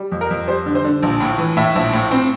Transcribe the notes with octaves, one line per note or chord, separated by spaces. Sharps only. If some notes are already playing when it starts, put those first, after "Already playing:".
Already playing: G3
F2
A#4
F2
G3 C5
D3
C5
D3
A#1
A2
E3
A2 E5
A#1
A2
C4